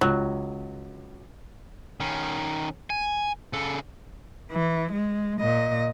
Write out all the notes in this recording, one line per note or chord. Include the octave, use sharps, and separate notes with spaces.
C#2 F#3
D#3 C#4
G#5
C#3 A4
E3
G#3
A#2 D#5